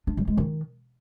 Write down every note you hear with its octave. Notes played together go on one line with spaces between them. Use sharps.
D4
G3
G#3
D#3